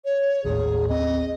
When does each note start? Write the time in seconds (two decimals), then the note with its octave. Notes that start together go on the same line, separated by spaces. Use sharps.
0.05 C#5
0.44 G#1 D#2 A2 G#4
0.89 D#2 C4 D#5